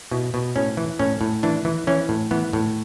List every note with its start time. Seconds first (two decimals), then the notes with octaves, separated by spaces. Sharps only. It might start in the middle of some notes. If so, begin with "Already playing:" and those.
0.11 B2 E4
0.34 B2
0.56 A2 C#4
0.77 E3
0.99 A2 C#4
1.21 A2
1.43 E3 D4
1.65 E3
1.87 E3 C#4
2.09 A2
2.31 E3 B3
2.53 A2